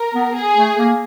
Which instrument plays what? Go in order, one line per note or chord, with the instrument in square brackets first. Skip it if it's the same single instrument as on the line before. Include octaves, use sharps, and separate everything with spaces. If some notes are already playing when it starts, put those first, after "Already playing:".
Already playing: [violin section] A#4
[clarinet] B3
[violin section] G#4
[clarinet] A3
A#3